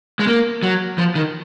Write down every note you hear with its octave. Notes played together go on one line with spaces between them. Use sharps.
G#3
A#3
F#3
F3
D#3